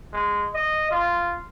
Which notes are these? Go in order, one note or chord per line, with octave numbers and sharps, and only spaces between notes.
G#3
D#5
F4